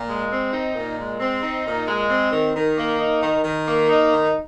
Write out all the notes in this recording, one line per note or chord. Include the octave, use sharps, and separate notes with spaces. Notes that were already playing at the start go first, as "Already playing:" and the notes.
Already playing: A#2
G#3
C4
D#4
A#2
G#3
C4
D#4
A#2
G#3
C4
D#3
D#3
A#3
D#4
D#3
D#3
A#3
D#4
D#3